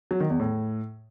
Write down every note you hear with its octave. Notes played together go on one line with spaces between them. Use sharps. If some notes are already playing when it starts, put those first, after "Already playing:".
F#3
D#3
E2
A2